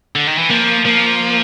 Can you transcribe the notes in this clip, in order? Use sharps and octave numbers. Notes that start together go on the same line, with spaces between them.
D3
D#3
E3
F3 A#3
F3 A#3